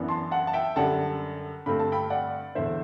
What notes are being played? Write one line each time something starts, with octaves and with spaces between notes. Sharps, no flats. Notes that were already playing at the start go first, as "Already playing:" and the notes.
Already playing: F#2 E3 B3 D4
A5 C6
F#5 A5
A5
E5 G5
F#2 D3 G3 F#5 A5
G2 D3 A3 C4 B5
A5
G5 B5
D5 F#5
E2 D3 C5 E5